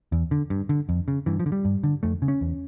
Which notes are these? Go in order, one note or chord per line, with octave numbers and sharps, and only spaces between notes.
E2
D3
G2
D3
F2
C#3
G2 E3
F3
D3
G3
G2
D3
F2 A3
C#3
C#4
E2